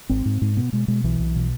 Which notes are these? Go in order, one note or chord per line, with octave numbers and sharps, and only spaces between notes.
G#1 C4
G#2
G#2
B2 B3
B2 G#3
B2 G#3
B1 E3
B1
B2